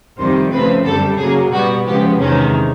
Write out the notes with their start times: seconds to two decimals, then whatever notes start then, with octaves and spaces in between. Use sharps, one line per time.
0.18 F2 C3 D#3 G3 C5
0.52 C#3 F3 A3 C4 B4
0.85 F#2 D3 G3 A4
1.18 C#3 F#3 A#3 G#4
1.52 B2 G3 B3 F#4
1.85 C#3 F3 G#3 B3 G4
2.19 E2 C3 D#3 G#3 C#4